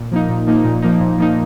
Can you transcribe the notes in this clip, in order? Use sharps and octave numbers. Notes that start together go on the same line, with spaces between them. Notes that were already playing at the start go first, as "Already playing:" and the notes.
Already playing: A#2
F3 A#3 D#4
A#2
F3 A#3 D#4
A#2
F3 A#3 D#4
A#2
F3 A#3 D#4